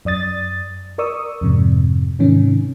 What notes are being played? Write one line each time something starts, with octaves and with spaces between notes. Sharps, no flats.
F#2 D5 D#6 A6
A#4 D5 C#6 D#6 E6
F2 G#2 C3
G#2 C3 D#3 C#4